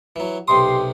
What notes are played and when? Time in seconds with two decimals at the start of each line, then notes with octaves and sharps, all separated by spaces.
0.16 E3 F#3
0.48 B1 C3 G4 C6 D#6